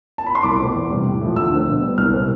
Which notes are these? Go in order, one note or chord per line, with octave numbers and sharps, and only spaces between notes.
A5
B5
C6
C2 D6
B2 A3 C4
E2
C3 G3
A2
F3 A3
D2 E6
D3 A3 C4
B2
G3
B3
C2 F6
C3 G3 C4